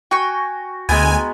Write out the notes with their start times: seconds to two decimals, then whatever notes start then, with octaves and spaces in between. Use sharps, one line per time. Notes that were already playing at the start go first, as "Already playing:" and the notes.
0.11 F#4 G5 G#5 C#6
0.89 D2 G#3 B3 E4 G5 G#5 A#5